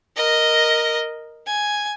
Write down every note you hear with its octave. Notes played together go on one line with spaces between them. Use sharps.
A#4 D#5
G#5